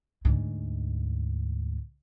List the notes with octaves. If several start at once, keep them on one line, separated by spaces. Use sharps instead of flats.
D2 G#2